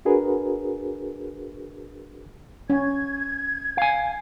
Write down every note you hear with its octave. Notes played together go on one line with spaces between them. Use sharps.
D4 F#4 G#4 A#4 B4
C#4 G#6
F5 G#5